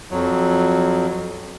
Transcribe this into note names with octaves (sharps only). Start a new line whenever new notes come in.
F2 F#3